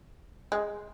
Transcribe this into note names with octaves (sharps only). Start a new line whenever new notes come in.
G#3